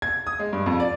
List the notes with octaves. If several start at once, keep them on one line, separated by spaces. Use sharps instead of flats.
G#6
D#6
G#3
G2
F2
D5